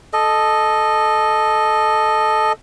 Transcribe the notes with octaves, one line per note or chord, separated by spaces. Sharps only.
A4 D#5